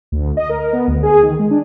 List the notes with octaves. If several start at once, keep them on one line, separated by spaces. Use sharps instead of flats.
D2
D#5
A#4
B3
D2
G#4
D#3
G#3
D4